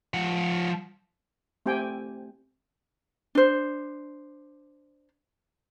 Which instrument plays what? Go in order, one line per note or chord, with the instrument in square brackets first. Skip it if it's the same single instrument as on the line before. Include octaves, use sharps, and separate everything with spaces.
[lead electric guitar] F3 F#5
[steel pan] A3 C4 G4 G5 G#5
[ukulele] D4 C5